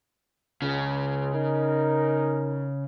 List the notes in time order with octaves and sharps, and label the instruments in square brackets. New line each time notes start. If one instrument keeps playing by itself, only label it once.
[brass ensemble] C#2 [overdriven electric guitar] C#3
[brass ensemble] D#4 A#4